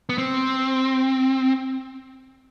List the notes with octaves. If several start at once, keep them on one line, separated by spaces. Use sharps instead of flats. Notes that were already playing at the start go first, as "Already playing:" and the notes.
B3
C4